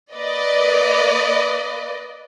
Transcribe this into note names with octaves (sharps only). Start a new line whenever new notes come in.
A#3 B4 D5 D#5